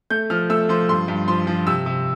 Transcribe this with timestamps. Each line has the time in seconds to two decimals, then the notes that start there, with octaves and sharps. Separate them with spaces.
0.10 A3 G6
0.30 F3 F6
0.50 A3 E6
0.69 F3 C6
0.89 G2 C6
1.08 G2
1.28 F3 C6
1.47 F3
1.67 C3 E6
1.86 C3